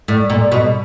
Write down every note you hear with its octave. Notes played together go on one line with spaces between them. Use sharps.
A2
A#2
B2